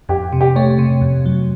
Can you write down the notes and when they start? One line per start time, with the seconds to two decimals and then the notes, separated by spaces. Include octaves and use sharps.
0.09 F2 G4
0.33 C3
0.41 G4
0.56 A3 C#5
0.79 C3
1.01 F2
1.26 F#3